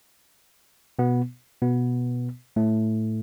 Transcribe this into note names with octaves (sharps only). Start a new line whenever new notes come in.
B2 B3
B2 B3
A2 A3